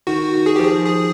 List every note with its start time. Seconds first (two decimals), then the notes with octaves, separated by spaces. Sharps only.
0.07 D#3 F#4
0.34 D#3
0.46 G#4
0.56 F3 G4
0.65 G#4
0.85 G#4